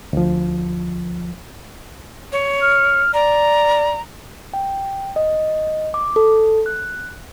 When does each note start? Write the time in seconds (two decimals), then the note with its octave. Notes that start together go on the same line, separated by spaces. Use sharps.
0.13 D2 F3
2.32 C#5
2.62 F6
3.14 D5 A#5
4.54 G5
5.16 D#5
5.94 D6
6.16 A4
6.66 F#6